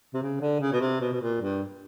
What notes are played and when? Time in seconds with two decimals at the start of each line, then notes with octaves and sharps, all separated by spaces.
0.14 C3
0.22 C#3
0.41 D3
0.61 C#3
0.72 B2
0.80 C3
1.01 B2
1.13 B2
1.21 A#2
1.41 G2